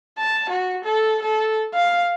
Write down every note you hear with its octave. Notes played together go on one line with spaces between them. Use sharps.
A5
F#4
A4
A4
F5